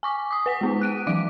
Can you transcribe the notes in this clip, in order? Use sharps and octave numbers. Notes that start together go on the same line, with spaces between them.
G#5 C#6 D6
D6 D#6
B4 F#5 B6
G#3 B3 D#4
F#6 D7 D#7
E3 F#3 D6 D7